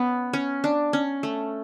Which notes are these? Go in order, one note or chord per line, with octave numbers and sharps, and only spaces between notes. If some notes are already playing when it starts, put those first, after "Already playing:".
Already playing: B3 C#4
C#4
D4
C#4
A3